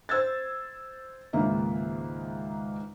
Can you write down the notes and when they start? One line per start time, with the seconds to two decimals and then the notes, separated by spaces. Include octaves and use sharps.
0.09 C5 E6 G#6 A6
1.33 C#2 G#2 D#3 A#3 E5